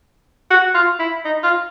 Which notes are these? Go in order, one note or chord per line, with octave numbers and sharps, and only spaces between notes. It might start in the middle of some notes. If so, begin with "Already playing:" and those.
F#4
F4
E4
D#4
F4